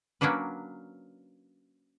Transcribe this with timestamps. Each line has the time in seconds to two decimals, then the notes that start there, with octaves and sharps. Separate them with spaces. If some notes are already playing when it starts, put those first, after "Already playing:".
0.21 F#3 A#3 C#4 D4 B4